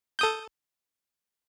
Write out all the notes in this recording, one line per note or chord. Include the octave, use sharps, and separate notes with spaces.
A4 D#6 G6